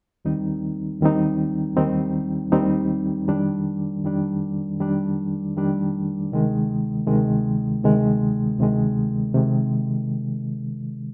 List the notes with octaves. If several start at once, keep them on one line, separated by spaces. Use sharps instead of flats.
D#2 D#3 G3 C4 D#4
D#2 D#3 G3 C4 D#4
D#2 D#3 G3 C4 D#4
D#2 D#3 G3 C4 D#4
F2 D#3 G3 D4
F2 D#3 G3 D4
F2 D#3 G3 D4
F2 D#3 G3 D4
D2 C3 D#3 G#3
D2 C3 D#3 G#3
D2 C3 D#3 G#3
D2 C3 D#3 G#3
C3 D#3 G#3